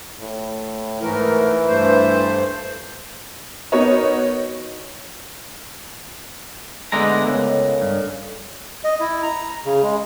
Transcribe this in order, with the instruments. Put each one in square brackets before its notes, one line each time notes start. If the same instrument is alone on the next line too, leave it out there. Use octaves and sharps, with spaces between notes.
[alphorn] A2
[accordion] G#2 A3 A#4 [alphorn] E3
[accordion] G2 A3 C5
[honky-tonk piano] B3 D#4 F#4 A#4 C#5 D#5
[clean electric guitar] D3 G#3 A#5 [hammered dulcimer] A3 B3 D#4
[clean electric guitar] C#2 [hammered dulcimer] C#3 A4 A#4
[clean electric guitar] G2
[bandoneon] D#5
E4
A#5
C#3
G#3